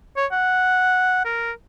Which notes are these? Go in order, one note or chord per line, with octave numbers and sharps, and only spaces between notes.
C#5
F#5
A#4